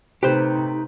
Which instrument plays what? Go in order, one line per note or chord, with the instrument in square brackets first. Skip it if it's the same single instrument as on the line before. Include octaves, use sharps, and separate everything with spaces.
[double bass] C3 [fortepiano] A3 B4 [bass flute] D#4 [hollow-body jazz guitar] G4 C5